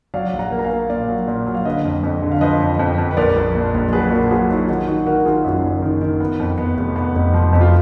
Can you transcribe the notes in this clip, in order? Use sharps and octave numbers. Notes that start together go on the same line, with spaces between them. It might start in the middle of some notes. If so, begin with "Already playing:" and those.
F#3 D5 F5
A#1
F#5 A#5
A#3
A#5
F5 G#5
A#3
A#2 D5 F5
F#3
A#2
F#3
F5
D3 B4 D#5
F2
F2
D3
F5
F3 B4 D#5
F2
F2
F2
B4
A#1 A#4 D5
A#1
A#2
A#1
F#3 G#4 B4
A#2 F#4 A#4
F#3 F4 G#4
F#3 D#4 F#4
D#3 D#4 F#4
D#3 D#4 F#4
D#3 F#4 A#4
A#4
D#3 F4 G#4
F#2 D#4 F#4
F#1
D#3
D#3
B3
F2
B3
F1
B3
F1
F3
F2
F4